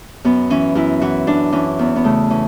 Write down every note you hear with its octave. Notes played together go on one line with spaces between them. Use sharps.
F#2 B3
E3 C#4
F#2 E4
E3 F#4
F#2 D4
E3 C#4
E2 B3
B3
C#3 A3
E3 C#4